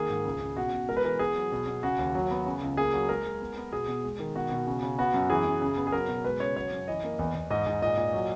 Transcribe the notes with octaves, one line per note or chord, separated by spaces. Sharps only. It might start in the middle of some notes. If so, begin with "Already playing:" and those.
Already playing: D#3 A#3 G#4
G#2
C#2
C#3
B2 F#4
B2
G#3 A#4
B4
E3 A#4
B3 G#4
F#3
B2
B2
C#3 F#4
D#2
F#3
B3
C#3
C#2
A#3 G#4
F#3
G#3 A#4
G#3
B3
B3
B2 G#4
B2
G#3
D#3
B2 F#4
B2
C#3
C#3
B3 F#4
F#2
E3 G#4
F#2
C#3
B3
G#4
F#3 A#4
B2
G#3 B4
C#3 C#5
F#3 C#5
F#2
E3 D#5
A#3
E2
E2
G#2 D#5
G#2
A#2 D#5
A#2
F#3